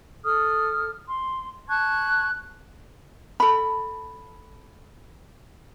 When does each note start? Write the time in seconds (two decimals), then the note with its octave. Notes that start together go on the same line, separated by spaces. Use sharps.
0.24 A4 D#6 F6
1.09 C6
1.68 A5 C#6 F#6 G#6
3.40 A4 B5